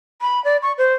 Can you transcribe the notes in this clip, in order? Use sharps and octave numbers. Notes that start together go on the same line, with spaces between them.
B5
D5
C#6
C5